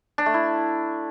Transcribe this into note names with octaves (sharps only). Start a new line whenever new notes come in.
D4
A3
E4